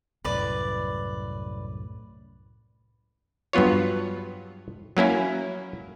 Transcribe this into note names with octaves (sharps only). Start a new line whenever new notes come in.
C2 F#2 A2 B4 D5
G2 F#3 B3 F4 C#5
F#3 A#3 C#4 E4